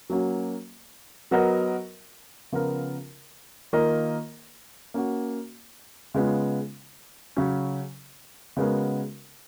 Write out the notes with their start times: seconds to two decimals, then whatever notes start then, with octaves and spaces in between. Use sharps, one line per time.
0.10 F#3 A#3 C#4 F#4
1.31 F#3 B3 F#4 A#4 D#5
2.52 C#3 F3 B3 F4 A#4
3.73 D#3 A#3 F4 A#4 D#5
4.94 A#3 C#4 F#4
6.14 C#3 G#3 B3 F4
7.36 C#3 F#3 C#4
8.57 C#3 G#3 B3 F#4 A#4